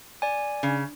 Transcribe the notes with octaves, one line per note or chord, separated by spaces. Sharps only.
D5 G#5
C#3